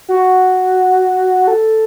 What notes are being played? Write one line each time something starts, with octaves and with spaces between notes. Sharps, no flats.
F#4
A4